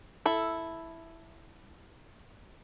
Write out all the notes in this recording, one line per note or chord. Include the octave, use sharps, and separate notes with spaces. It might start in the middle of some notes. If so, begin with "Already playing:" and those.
E4 A4